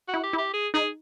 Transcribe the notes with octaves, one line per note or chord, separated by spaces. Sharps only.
F#4
E4
G4
E4
G4
G#4
D#4 G#4